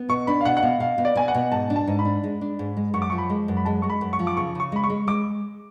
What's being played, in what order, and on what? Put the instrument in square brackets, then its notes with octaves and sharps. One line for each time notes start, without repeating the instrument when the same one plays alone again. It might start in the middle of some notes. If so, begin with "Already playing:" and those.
Already playing: [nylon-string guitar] B3
[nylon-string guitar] B2 [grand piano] C#6
[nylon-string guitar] D4 [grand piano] B5
[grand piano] F5
[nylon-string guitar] B2 [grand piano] F#5
[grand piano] F#5
[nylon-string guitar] B2 [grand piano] F5
[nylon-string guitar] B2 [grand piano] F5
[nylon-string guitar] B2
[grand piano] D5
[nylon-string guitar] B2 [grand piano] G#5
[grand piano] F#5
[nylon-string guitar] B2
[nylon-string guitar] G#2 [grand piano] A5
[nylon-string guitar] D4
[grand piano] A5
[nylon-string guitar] G#2
[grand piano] B5
[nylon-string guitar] D4
G#3
D4
G#2
G#3
[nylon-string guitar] F#2 [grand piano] C#6
[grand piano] D6
[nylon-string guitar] F3 [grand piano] C#6
[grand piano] B5
[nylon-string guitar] G#3
F#2
[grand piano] B5
[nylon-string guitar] G#3 [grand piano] A5
[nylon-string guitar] G#3 [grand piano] C#6
[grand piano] B5
[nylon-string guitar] F#2
[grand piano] C#6
[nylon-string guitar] F3
[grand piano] D6
[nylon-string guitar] C#3 [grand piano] C#6
[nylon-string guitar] C#3 [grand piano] C#6
[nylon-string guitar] G#3 [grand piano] B5
[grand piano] C#6
[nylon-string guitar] G#3
[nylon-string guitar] G#3 [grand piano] D6